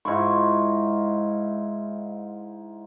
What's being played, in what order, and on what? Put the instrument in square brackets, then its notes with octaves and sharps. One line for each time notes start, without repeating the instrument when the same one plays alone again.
[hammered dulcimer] G#2 E4 F4 C#6